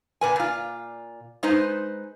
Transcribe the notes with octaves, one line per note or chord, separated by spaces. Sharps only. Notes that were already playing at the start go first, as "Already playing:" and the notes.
A#2 B4 G#5
A#2 F4
G#3 D#4 B4 C5